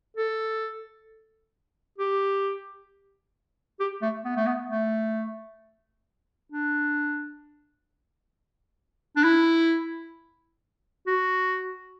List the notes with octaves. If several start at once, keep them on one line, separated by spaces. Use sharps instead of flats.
A4
G4
G4
A3
B3
A3
B3
A3
D4
D4
E4
F#4